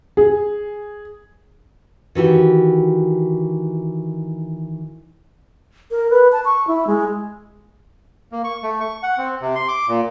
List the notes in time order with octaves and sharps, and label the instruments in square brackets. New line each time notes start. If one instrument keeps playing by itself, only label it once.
[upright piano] G#4
[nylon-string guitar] D#3 E3 F#4 G4
[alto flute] A#4
B4
A5
C#6
E4
G#3
[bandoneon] A#3
C#6
A3
C#6
F#5
C4
C3
C6
D6
A#2